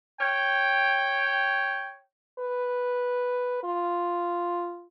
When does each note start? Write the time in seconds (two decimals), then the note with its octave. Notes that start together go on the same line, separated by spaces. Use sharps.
0.20 C#5 G5
2.39 B4
3.63 F4